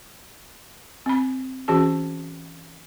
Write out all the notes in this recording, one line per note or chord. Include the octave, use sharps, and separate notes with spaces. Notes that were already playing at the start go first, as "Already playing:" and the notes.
C4 B5
E3 C#4 F#4 G#4 A5